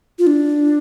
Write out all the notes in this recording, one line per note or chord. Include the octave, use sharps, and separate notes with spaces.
F4
D4